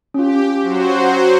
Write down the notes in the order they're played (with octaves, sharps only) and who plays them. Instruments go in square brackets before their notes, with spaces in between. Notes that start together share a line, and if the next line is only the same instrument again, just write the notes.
[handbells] C#4 F4 [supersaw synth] G4
[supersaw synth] F#3 F#4 C5